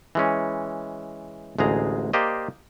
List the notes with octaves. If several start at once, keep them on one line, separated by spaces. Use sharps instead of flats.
E3 G#3 C#4
A1 D2 G#3 G#4 A#5
A#3 G4 C5 D5 D#5